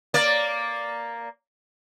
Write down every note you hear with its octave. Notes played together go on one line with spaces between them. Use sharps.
A#3 D5